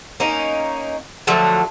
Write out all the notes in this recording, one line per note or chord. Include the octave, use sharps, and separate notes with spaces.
A#3 C#4 D#4
D3 F3 F#3 A3